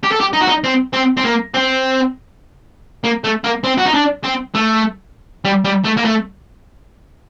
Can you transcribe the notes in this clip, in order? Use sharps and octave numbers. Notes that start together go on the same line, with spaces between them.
G4
A4
G4
D#4
F#4
D#4
C4
C4
C4
A#3
C4
A#3
A3
A#3
C4
F#4
D#4
D4
C4
A3
G3
G3
A3
A#3
A3